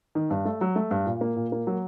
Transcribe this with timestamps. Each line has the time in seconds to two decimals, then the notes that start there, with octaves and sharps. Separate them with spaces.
0.15 D#3
0.30 G2
0.45 A3
0.61 F#3
0.76 A3
0.91 G2
1.06 A#2
1.21 A#3
1.36 A#2
1.52 A#3
1.67 F#3